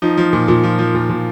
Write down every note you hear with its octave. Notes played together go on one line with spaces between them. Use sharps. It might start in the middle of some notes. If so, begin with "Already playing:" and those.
F3 D#4
F3
A#2
A#2
F3
F3
A#2
A#2